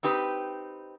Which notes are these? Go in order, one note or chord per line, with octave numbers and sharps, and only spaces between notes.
C4 D#4 G4 B4